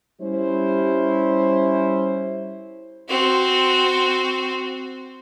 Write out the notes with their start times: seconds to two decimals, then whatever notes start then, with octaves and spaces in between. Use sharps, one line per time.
0.21 G3 C#4 E4 C5
3.09 C4 F#4